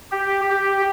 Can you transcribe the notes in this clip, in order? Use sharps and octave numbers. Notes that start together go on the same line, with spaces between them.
G4
G4